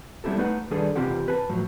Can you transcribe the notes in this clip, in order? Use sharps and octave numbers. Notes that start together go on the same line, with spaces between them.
G3 B3 C4 E4 G4 A4
A3 D#4 B4 E5 F#5
D#3 G3 D4 G#4 A4 B4
C3 E3 C4 F4 G4 F#5
B4 G#5 A5
A2 F3 F#3